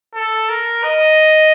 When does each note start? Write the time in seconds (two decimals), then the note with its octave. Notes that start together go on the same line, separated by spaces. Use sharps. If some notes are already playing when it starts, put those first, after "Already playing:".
0.15 A4
0.49 A#4
0.84 D#5